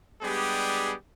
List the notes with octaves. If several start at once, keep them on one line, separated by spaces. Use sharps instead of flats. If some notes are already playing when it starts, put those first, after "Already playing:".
G3 G#3 B3 D4 G4 G#4